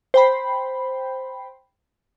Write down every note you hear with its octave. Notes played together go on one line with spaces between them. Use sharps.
C5 G5 B5